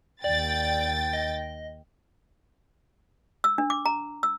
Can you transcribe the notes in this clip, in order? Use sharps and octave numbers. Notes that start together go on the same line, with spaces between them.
D#2 D5 G5 A6
D#5
E6
D4
D6
A#5
E6